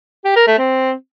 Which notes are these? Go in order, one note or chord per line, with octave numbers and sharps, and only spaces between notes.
G4
A#4
A3
C4